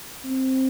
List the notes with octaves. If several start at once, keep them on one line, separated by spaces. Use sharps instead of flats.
C4